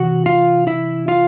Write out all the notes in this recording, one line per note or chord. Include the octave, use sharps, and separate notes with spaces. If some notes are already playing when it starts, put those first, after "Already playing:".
Already playing: C3 E3 F#4 F#5
F4 F5
E4 E5
F4 F5